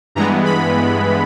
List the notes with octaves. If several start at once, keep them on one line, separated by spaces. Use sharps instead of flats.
G2 E3 G#3 B3 A#5
B5